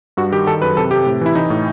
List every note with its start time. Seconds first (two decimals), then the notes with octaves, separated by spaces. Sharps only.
0.17 G2 F#4
0.32 D#3 G4
0.47 D#3 A4
0.62 F#2 B4
0.77 C3 A4
0.91 C3 G4
1.06 A2
1.21 E3 E4
1.35 E3 D#4
1.50 A2